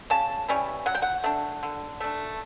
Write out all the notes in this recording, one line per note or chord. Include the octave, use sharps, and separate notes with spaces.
C#3 A5
E3 G3 C#4
F#3 F#5
G5
F#5
A3 D4
D3
A3 D4